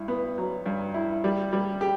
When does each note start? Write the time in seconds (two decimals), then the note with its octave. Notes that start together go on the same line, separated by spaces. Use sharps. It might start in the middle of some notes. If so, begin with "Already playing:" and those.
Already playing: G2 E4
0.08 B3
0.38 F#3
0.66 G2
0.94 E4
1.24 G3
1.53 G3
1.81 G4